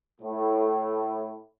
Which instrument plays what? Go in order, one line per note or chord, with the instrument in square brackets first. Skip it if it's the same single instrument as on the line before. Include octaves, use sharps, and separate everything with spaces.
[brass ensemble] A2